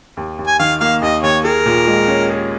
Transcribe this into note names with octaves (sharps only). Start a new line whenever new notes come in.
D#2
D#2
G#5
D#3 F5
A#3 F5
D#2 D#5
D#2 C#5
G#4 A#4
A#2
G#3
C#4
G#4